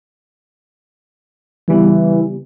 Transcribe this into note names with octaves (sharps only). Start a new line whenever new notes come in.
C#3 E3 G3 B3